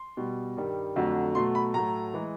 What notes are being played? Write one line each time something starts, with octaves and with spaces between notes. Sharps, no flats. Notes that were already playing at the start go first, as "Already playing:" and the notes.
Already playing: C6
B2 G3
G2 D#3 G3
F2 D3 F#3 A3
B2 F#3 A3 C6
B5
A2 F#3 A3 A#5
E3 G#3